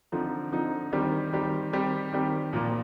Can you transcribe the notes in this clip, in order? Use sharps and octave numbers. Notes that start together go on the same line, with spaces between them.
D3 F3 C4 D#4
D3 F3 C4 D#4
D#3 G3 C4 G4
D#3 G3 C4 G4
D#3 G3 C4 G4
D#3 G3 C4 G4
A#2 F3 A#3